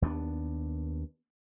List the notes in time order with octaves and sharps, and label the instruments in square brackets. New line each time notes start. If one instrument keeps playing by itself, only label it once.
[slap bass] D#2 B3 C#4 D4